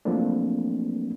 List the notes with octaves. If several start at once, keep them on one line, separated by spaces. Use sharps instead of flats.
F3 F#3 A3 A#3 C4 D4